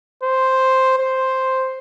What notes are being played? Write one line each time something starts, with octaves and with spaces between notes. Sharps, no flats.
C5
C5